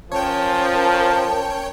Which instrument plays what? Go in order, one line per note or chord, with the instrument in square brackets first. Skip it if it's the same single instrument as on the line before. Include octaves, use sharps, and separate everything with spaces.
[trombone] F3 [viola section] C#4 A#4 [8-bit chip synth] C#5 G5 [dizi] A5